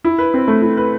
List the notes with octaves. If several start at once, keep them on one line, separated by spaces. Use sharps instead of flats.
E4
B4
C4
A3
E4
B4